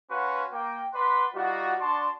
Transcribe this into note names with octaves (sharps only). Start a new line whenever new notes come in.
C#4 F#4 B4 F5 F#5 C6
A#3 G5
B4 D5 F#5 B5 C6
G3 D#4 F4 F#4
D4 F#4 D5 A5 C6